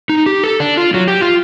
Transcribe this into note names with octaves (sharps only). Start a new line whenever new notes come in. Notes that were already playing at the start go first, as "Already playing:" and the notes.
D#4
G4
A4
D4
F4
F#3
G4
F4